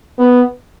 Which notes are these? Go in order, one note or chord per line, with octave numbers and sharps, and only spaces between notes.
B3